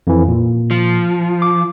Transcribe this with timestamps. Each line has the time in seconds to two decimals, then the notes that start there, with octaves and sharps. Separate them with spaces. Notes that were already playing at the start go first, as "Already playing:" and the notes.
0.07 F2 E3
0.28 A#2
0.71 F3
1.42 D6